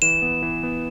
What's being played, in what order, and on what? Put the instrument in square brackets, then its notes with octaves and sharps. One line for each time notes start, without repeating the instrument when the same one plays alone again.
[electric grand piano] E3 [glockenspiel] E7
[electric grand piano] B3
E3
B3